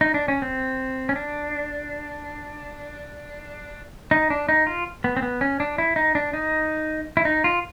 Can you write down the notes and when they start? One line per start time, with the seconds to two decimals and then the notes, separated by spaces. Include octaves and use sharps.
0.01 D#4
0.14 D4
0.28 C#4
0.42 C4
1.09 C#4
1.16 D4
4.11 D#4
4.30 D4
4.49 D#4
4.67 F4
5.04 B3
5.17 C4
5.22 B3
5.41 C#4
5.60 D4
5.78 E4
5.96 D#4
6.15 D4
6.33 D#4
7.17 E4
7.25 D#4
7.44 F4